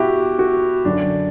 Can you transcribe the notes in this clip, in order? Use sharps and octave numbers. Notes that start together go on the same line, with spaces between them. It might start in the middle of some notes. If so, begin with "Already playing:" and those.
Already playing: B2 E4 F#4 G4
F#4
F#2 D3 F#3 D4